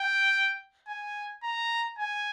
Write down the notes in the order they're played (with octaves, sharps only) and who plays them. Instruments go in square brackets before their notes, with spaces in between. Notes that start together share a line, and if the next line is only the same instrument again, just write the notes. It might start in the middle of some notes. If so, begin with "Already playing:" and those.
Already playing: [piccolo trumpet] G5
G#5
A#5
G#5